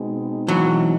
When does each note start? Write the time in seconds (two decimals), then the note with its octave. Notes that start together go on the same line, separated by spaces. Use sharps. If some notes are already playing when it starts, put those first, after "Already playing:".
Already playing: B2 G#3 C4 D#4
0.48 E3 F#3